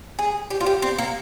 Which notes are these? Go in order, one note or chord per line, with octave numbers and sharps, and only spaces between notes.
G#4
G4
F4
G4
C4
A#3